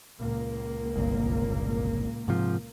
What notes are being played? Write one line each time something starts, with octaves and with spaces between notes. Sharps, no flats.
C#2 A#2 A#3
G1 C2
G#2 C3 F3